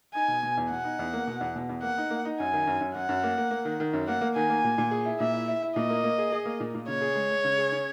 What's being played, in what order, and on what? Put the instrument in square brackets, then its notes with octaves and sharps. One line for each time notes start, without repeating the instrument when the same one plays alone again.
[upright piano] D#4 [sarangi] G#5
[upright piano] B2
B2
E2
[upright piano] B2 [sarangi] F#5
[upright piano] D#4
E2
A#3
B2
E2
B2
E2
[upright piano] A#3 [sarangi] F#5
[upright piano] D#4
A#3
D#4
[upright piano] F#2 [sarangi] G#5
[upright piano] D#3
F#2
F#2
[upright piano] F#2 [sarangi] F#5
[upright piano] F#2
A#3
A#3
A#3
D#3
D#3
F#2
[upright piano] A#3 [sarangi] F#5
[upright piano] A#3
[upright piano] D#3 [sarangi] G#5
[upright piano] A#3
A#2
A#2
G#4
E4
[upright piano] A#2 [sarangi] E5
[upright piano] E4
E4
E4
[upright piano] A#2 [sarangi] D#5
[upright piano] A#3
A#3
G#4
G#4
A#3
A#2
A#2
[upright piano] C#3 [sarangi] C#5
[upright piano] G#4
G#3
G#3
C#3
G#4
C#4